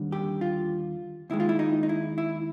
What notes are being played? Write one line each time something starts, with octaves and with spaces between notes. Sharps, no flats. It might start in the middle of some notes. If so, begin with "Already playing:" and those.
Already playing: D#2 D3 G3
G4
F4
D#2 D#3 G#3 E4
F4
E4
D#4
D#4
E4
E4